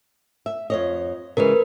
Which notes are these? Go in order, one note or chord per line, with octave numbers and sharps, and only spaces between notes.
E5
F2 C#5 D#5
C#3 E3 G#3 A#4 B4